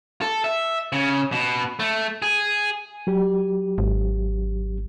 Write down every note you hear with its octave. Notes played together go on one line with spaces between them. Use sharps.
A4
E5
C#3
B2
A3
G#4
F#3 G4
G#1